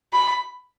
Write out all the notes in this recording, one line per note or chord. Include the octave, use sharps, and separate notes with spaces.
B5